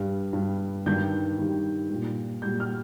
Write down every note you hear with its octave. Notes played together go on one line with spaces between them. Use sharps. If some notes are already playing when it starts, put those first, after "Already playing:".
Already playing: G2 G3
G2 G3
G2 D#3 G3 G6
G2 D#3 G3
A#2 G3
A#2 G3 G6
F6